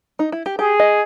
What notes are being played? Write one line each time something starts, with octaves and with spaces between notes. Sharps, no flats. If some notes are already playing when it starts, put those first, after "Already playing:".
D#4
E4
G4
G4 G#4
D#5